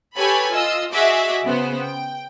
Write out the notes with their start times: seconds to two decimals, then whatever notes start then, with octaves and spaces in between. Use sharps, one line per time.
0.16 G4 A4 B4 C#5 G#5 B5
0.52 F4 D#5 E6
0.93 F#4 G#4 D#5 E5 D6
1.44 C#3 B3 C5
1.82 G5